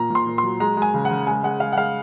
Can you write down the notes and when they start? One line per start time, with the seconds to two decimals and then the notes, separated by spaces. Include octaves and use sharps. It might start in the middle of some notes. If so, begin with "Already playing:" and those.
Already playing: A#2 A#5
0.10 A#2 C6
0.27 A#2
0.38 F#3 C6
0.60 G#3 A#5
0.77 G#3
0.82 G#5
0.94 C#3
1.05 F#5
1.11 C#3
1.27 G#3 G#5
1.43 G#3 F#5
1.60 G#3 F5
1.73 F#5
1.77 G#3 F5